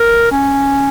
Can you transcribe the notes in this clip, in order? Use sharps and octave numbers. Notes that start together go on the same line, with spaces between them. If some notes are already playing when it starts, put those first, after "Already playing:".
Already playing: A#4
C#4